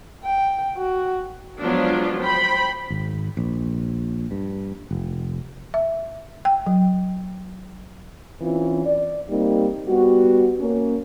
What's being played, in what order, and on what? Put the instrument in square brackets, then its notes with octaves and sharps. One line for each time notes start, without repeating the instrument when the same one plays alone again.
[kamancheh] G5
F#4
[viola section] F3 F#3 G#3 B3 D4 F4
C5 G5 B5
[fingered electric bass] G#1
A#1
G2
F1
[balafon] E5
G5
F#3
[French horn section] E3 C4 C#4 F4
D5
G3 A#3 C4 D#4
G3 B3 F#4
A#3 C#4